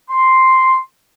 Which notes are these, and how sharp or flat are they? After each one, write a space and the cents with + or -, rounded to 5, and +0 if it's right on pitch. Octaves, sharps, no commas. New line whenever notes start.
C6 +0